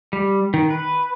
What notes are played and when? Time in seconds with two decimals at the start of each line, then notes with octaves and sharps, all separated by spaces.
0.13 G3
0.54 D#3
0.70 B4